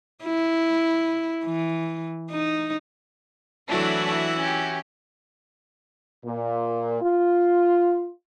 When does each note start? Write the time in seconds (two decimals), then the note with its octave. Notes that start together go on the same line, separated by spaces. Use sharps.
0.23 E4
1.45 E3
2.31 D#4
3.69 E3 F#3 A3 D4 E4 F#4
4.37 C#4 G4
6.24 A#2
7.01 F4